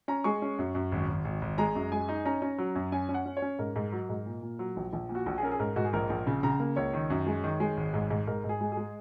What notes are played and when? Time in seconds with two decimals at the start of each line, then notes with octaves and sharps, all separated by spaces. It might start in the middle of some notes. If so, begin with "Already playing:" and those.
0.08 C#4 A#5
0.24 G#3 C#6
0.42 C#4
0.58 F#2
0.75 F#2
0.92 G#1
1.08 G#1
1.25 G#1
1.42 G#1
1.58 G#3 A#5
1.75 F#2
1.92 G#3 G#5
2.08 D#4
2.25 C#4 A#5
2.42 C#4
2.58 F#3
2.75 F#2
2.92 C#4 G#5
3.09 C#4
3.14 F#5
3.26 C#4
3.37 C#5
3.42 C#4
3.59 G#2 A#4
3.76 G#2
3.92 F#3
4.09 G#2
4.26 A#2
4.42 A#2
4.59 F#3
4.76 A#1
4.93 A#1
5.09 A#2
5.15 F#4
5.26 A#1
5.38 G#4
5.43 C#4 A#4
5.51 G#4
5.59 G#2 A#4
5.76 G#2 F#4
5.85 G#4
5.93 A#1 A#4
6.10 A#1
6.27 C#3
6.43 C#3 A#5
6.60 A#3
6.76 C#2 C#5
6.94 D#3
7.10 F#2
7.27 G#3
7.44 D#3
7.60 G#3
7.77 G#1
7.94 G#2
8.10 G#2
8.27 G#2 A#4
8.44 G#2
8.49 G#4
8.61 G#3
8.72 G#4
8.77 G#3